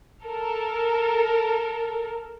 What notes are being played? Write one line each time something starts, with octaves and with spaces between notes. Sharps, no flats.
A4 A#4